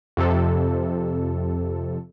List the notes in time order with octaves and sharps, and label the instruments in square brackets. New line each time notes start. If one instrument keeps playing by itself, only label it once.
[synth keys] F2 C3 A4